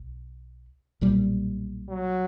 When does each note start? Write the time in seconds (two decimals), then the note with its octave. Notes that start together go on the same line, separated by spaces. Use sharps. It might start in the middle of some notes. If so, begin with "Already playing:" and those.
Already playing: B1
1.01 B1 A#2 G3
1.90 F#3